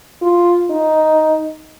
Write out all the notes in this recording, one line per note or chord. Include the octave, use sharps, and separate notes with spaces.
F4
D#4